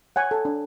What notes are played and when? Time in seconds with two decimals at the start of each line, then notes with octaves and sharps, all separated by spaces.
0.16 C#5 F#5 G#5
0.31 A4
0.45 D4